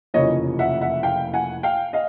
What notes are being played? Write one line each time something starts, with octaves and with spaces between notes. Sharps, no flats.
F1 E2 C#3 F3 A#3 C#5 D#5
E5 F#5
E5 F#5
F5 G5
F#5 G#5
F5 G5
D#5 F5